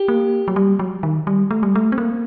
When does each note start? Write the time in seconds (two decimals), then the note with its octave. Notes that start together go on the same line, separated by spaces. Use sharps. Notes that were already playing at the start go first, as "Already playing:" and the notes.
Already playing: G4
0.08 A#3
0.48 F#3
0.56 G3
0.79 F#3
1.03 D#3
1.27 G3
1.51 A3
1.63 G3
1.75 A3
1.92 C4
1.98 A#3